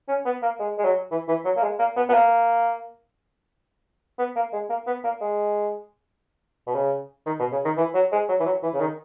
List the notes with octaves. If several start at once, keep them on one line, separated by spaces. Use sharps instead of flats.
C#4
B3
A#3
G#3
G#3
F#3
E3
E3
F#3
A#3
G#3
A#3
B3
B3
A#3
B3
A#3
G#3
A#3
B3
A#3
G#3
B2
C#3
D#3
B2
C#3
D#3
E3
F#3
G#3
F#3
E3
F#3
E3
C#3
D#3